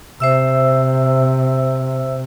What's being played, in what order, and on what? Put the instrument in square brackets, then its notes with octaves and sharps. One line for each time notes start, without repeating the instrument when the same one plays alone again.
[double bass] C3 [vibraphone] C5 E5 E6